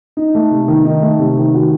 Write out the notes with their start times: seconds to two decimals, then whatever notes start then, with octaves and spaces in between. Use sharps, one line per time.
0.17 D#4
0.35 A3
0.51 C3
0.68 D#3
0.85 D#4
1.02 A3
1.19 C3
1.37 D#3
1.54 F#4